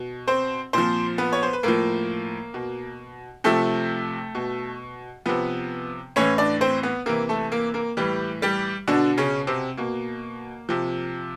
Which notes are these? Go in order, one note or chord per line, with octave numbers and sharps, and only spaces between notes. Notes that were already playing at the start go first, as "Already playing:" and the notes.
Already playing: B2
C4 C5
A#2 F3 C4 C5
B3 B4
C#5
C5
B4
A2 F3 A#3 A#4
B2
C3 F3 A3 A4
B2
C3 F3 B3 B4
A2 E3 C#4 C#5
D4 D5
C4 C5
B3 B4
C3 E3 A#3 A#4
A3 A4
A#3 A#4
A#3 A#4
A2 E3 G3 G4
G3 G4
B2 D3 D4
C#3 C#4
C3 C4
B2 A#3
C3 F3